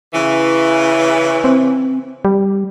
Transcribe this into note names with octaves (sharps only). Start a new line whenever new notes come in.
C#3 E3
C4
G3